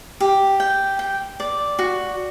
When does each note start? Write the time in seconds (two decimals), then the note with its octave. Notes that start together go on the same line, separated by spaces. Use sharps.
0.20 G4
0.60 G5
0.99 G5
1.40 D5
1.79 F#4